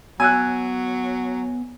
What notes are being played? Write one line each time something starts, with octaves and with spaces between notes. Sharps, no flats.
F#3 B3 G#5 E6 F#6